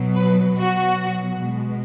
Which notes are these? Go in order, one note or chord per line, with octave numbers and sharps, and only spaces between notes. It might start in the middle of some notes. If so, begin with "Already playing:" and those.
Already playing: B2 F#3
B4
B2 F#3 F#4
B2 G#3